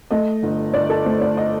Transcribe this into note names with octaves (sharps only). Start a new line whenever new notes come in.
A3 D#5
G1
G1 D5
A4
A3 C5
D5
D#5